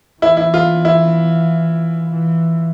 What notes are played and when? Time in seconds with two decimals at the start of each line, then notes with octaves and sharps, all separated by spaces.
0.22 E3 E4
0.37 E4
0.54 F4
0.85 E4
2.11 E3